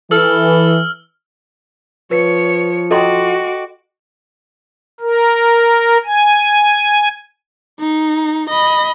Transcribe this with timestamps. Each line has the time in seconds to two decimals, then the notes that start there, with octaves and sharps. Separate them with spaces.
0.11 E3 A4 E6 F6
2.11 F3 B4 C#5 C#7
2.91 F#4 A4 D#5 G5 A#5 C6 D6
5.00 A#4
6.05 G#5
7.80 D#4
8.50 D#5 B5